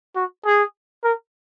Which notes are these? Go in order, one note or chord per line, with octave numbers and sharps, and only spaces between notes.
F#4
G#4
A#4